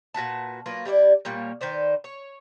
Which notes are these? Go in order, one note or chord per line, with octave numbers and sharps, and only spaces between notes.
A#2 F#4 B4 A5
F#3 A#3 F4 B4
G3 E4 C#5 D5
A#2 G3 A#3 C#5
D#3 B4 C5 D5
C#5